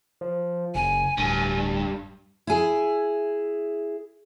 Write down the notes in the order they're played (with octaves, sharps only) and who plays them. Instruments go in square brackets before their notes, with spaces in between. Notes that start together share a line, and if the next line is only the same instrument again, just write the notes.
[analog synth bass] F3
[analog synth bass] F#1 [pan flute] G#5
[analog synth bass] D1 [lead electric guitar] G2
[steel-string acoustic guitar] E4 G#4